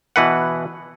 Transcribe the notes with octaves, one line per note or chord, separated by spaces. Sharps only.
B2 E3 B4 F#5